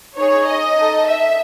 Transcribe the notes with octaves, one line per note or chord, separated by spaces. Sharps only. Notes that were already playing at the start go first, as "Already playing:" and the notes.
D#4 G#4 C#5
D#5
D#4 A4
E5